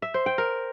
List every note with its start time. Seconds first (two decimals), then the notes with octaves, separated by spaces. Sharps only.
0.02 E5
0.14 C5
0.26 G5
0.38 A#4